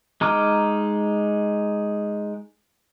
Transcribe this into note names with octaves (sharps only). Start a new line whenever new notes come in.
G#3 D#4 A#5 D6 F6